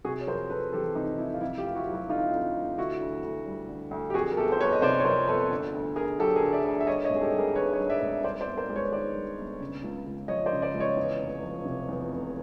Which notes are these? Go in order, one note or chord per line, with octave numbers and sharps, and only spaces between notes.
C3 F#4 G#4
C#5
F2 A#4 C5
F2 A4 B4
E3 G4 A4
C3 D#4
F2 E4
F4
F2 E4
F4 G4
F1
E4 F#4
F#3
E4 F#4
D3 D#4 F4
F2
F1
D3 E4 F#4
D2
D2
G3
D3
D2
G4
F2 F#4 G#4
A#4
G1 G4 A4
C5
G1 B4 C#5
D#5
C3 C5 D5
C#5
F2 A#4 C5
G1 A4 B4
D3
D2
A3 G#4 A#4
F#3 G4 A4
G#4 A#4
D3
D5 E5
D2
E5
G2 C#5 D#5
C#5 D#5
G#1
G#4
G4 A4
G3
G#4 A#4
D#3 B4 C#5
C#5 D#5
G2
D5 E5
G#1
G2 C5 D5
C5 D5
G1
A#4 C5
G#3
B4 C#5
D#3 C5 D5
G2
G1
C#3
C#2
C#2
F3 C#5 D#5
C5 D5
C#3
C5 D5
C#2
C#5 D#5
E2
F1
F3
C3
E2
F1